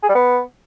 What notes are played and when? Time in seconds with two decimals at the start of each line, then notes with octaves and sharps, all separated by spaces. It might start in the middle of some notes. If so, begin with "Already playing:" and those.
0.03 G#4
0.09 G3
0.15 B3